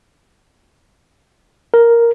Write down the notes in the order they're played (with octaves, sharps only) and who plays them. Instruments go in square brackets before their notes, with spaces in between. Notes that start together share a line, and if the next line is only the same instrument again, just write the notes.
[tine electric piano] A#4